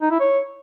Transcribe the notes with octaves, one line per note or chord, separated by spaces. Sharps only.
D#4
E4
C#5